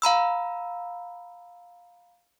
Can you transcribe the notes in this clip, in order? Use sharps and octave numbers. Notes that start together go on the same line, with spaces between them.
F5 A#5 B5 E6